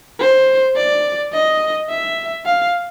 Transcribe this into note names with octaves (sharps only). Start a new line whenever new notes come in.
C5
D5
D#5
E5
F5